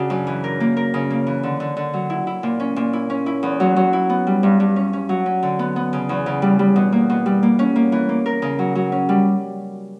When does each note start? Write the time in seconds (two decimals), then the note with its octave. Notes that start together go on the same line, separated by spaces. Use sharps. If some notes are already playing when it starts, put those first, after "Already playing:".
Already playing: C#3 D4 F#4
0.10 F#2
0.27 E3
0.44 A#4
0.60 A#3
0.77 A#4
0.94 C#3
1.10 A#3
1.27 E3
1.43 D3
1.60 D3
1.77 D3
1.93 F#3
2.10 E4
2.27 E4
2.43 A#2
2.60 C#4
2.76 A#2
2.93 E4
3.10 C#4
3.26 E4
3.43 E2
3.60 F#3
3.76 F#3
3.93 E4
4.10 B3
4.27 G3
4.43 G2
4.60 G2
4.76 C#4
4.93 C#4
5.09 F#3
5.26 C#4
5.43 D3
5.59 B3
5.76 B3
5.93 C#3
6.09 E2
6.26 C#3
6.42 G3
6.59 G3
6.76 B2
6.92 A#3
7.10 B2
7.26 G3
7.43 A#3
7.59 C#4
7.76 A#3
7.92 E3
8.09 A#3
8.26 A#4
8.42 C#3
8.59 F#3
8.75 F#3
8.92 C#4
9.09 G3